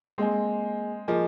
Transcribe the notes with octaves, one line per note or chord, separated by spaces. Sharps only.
G#3 A#3 C4 G#4 D#5 G#5
F3 A#3 F4 G#4 D#5 G#5